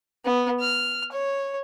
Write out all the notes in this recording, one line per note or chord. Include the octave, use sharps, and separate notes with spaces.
B3
F6
C#5